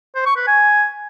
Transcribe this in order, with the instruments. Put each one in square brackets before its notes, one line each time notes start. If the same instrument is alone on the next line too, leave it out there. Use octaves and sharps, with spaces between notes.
[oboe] C5
C#6
B4
G#5